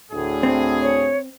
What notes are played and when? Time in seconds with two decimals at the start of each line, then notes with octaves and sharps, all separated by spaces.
0.12 D2 A2 G#4
0.43 C4
0.81 C#5